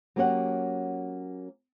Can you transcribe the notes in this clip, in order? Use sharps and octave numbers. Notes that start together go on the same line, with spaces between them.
F#3 A#3 C#4 G4 C#5 F#5